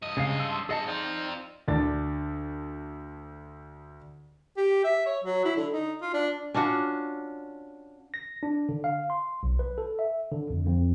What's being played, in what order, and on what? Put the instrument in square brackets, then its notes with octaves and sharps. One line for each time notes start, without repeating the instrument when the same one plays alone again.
[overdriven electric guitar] G2 D#5
[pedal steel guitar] C#3 G#3 F5
A5 C6 E6
[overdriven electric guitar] G2 F#5 [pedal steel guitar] G#4 D#5 A5
[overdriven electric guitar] C4 F4 [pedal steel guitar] D#4 D5 G5
[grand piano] D2 D4 A6
[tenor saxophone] G4
E5
C#5
F#3
E4
D3
D#4
F4
D4
[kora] C#4 D4 F4 F#4
[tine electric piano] A#6
D4
D3
F5
C6
B1
B4
A4
E5
D3
F2
F2